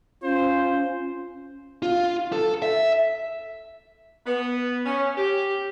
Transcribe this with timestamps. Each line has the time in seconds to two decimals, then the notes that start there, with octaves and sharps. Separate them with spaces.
0.23 C#4 F4 C5
1.83 F4
2.32 A4
2.62 E5
4.26 B3
4.85 C#4
5.17 G4